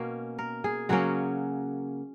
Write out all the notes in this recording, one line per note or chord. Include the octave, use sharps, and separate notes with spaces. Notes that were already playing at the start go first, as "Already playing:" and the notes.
Already playing: B2 A#3 C#4
A#4
G#4
C#3 F#3 A#3 C#4 F#4